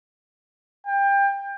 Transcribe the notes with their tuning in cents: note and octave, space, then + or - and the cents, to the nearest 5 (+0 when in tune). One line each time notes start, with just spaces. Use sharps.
G5 +25